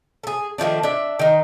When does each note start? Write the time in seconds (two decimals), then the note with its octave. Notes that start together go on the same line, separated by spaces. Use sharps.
0.23 G#4 A4
0.58 D#3 F3 A3 D4
0.83 D4 E5
1.19 D#3 D#4